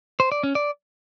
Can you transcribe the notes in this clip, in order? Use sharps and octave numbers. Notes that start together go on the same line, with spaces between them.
C5
D5
C#4
D5